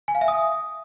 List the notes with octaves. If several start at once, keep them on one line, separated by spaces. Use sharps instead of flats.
G#5
F5
E5
D#6